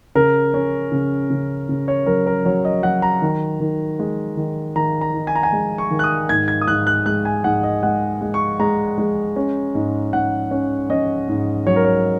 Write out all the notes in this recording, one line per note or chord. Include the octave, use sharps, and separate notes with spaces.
C#3 A#4
C#4
C#3
C#3
C#3
C#5
F#3 A#4
A#4
F#3 C#5
D#5
F#3 F#5
A#5
D#3
D#3
G#3
D#3
D#3 A#5
A#5
D#4
G#5
A#5
G#5
G#3
C#6
D#3
F#6
D#6
G#2 G#6
G#6
D#6
G#2 F#6
F#6
G#3 F#6
G#5
G#2 F#5
D#5
G#3 F#5
G#3
C#6
G#3 A#5
G#3
C#4
G#2
G#2 F#5
C#4
C#4 D#5
G#2
F#3 C#5
A#4
C#5